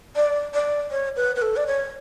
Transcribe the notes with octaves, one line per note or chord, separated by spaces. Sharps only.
D5
D5
C#5
B4
B4
A4
D5
C#5